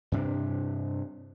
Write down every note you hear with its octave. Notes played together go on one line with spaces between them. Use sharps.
G2 C3 C#4 D4